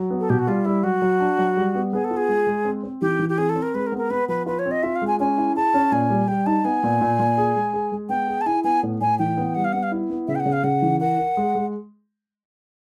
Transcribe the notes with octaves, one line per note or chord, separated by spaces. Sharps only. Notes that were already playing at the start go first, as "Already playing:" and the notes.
Already playing: F#3
B3
A4
B2 G4
F#4
G3 F4
G3 E4
F#3 F#4
F#3
D4
F#3
G3
B3
B3 G#4
A4
F4
G#4
G#3
G#3
C4
C4
E3 G4
E3
G4
C4 G#4
A4
C4
A#4
G#3 B4
A#4
B3
A#4
B3 B4
F3 B4
F4 B4
C#5
C4
D#5
F4 E5
F5
G#3
G#5
C#4 G#5
E4
G#4 A5
C#4
A#2 G#5
G3
G3 G5
D#4 A5
B3 G#5
A#2
A#2
A#2
G#4
G#3
G#4
G#3
B3 G5
G#4
A5
E4 G#5
B3 G#5
A2
A2 G#5
E3 G5
B3
G3 F#5
F5
B3 F#5
F5
E4
B3
C#3 E5
G5
F#5
C#3
F5
C#3 F#5
E3
A#4 F#5
A#4
G#3
G#3